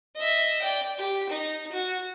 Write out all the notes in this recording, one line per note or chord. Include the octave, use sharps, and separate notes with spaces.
D#5 E5
D5 G5
G4
D#4
F#4